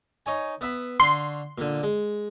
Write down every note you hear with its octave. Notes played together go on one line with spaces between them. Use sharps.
D#4 C#5 G#5
B3 E5 B5
D3 F5 C6 C#6
A#2 D3
G#3